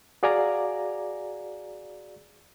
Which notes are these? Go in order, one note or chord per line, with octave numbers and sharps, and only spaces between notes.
F#4 G#4 D5 F5 G#5 A#5